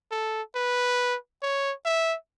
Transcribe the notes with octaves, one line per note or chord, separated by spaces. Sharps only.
A4
B4
C#5
E5